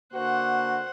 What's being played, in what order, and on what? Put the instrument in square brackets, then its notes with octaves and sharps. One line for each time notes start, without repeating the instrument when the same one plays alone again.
[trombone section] D3 A#3 F#4 [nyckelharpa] C5 F#5